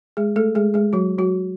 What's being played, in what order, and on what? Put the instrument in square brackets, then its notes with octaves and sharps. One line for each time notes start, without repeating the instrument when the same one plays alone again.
[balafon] G#3 G#4
A3 A4
G#3 G#4
G#3 G#4
F#3 F#4
F#3 F#4